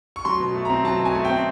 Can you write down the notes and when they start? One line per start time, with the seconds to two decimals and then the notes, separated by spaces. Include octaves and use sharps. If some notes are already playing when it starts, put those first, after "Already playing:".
0.16 C#6
0.25 F#3 C6
0.40 B2
0.55 A3
0.65 C4 A#5
0.84 F#3 A5
1.00 B2
1.05 G#5
1.15 A3
1.25 G5
1.30 C4